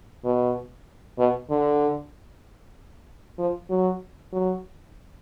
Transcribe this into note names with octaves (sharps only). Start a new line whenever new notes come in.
B2
B2
D3
F3
F#3
F#3